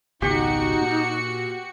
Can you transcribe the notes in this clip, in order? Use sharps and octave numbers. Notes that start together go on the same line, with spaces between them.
G#1 C#2 B2 D#4 F#4 G4 C#7
A#2